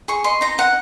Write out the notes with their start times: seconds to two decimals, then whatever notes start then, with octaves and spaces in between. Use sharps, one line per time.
0.08 G#4 C#6
0.24 D#5 C6
0.41 D#4 A#5
0.58 D#4 F#5